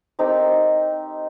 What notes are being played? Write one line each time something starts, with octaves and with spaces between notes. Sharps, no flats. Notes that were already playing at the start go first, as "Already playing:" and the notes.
C4 D#4 G4 A#4